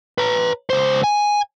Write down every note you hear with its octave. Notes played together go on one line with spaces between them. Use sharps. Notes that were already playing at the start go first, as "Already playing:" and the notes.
B4 A#5
C#2 C5
G#5